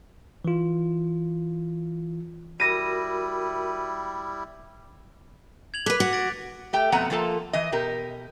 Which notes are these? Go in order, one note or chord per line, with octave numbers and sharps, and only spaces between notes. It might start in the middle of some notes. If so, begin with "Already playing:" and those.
E3 F4
G3 E4 F#4 A#4 A#6 D#7
G#6 F7 F#7
A4 B4 D6 F#6 B6
F#4
A6 D7
A3 G4 G5
F2 B2 A3 B3 F#5 A#5
F3 A#3 F4 A4 A5
E3 D#5
B2 G4 A#4